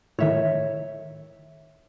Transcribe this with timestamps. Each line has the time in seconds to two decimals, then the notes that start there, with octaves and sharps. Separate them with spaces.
0.19 A2 D#3 C#5 E5